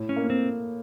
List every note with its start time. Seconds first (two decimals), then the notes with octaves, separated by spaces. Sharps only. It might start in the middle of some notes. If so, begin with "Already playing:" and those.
Already playing: A2
0.09 C#4
0.16 A#3
0.30 C4